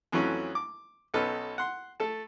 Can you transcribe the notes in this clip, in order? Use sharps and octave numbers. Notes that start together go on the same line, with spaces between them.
F2 E3 F#3 A3 C#4
D6
B1 C#4 D#4 A4 B4 F6
F#5 C6
A3 A4 A5